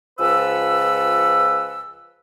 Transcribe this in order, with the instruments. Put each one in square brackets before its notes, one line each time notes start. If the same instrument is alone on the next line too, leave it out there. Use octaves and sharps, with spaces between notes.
[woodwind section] C#2 F3 B4 E6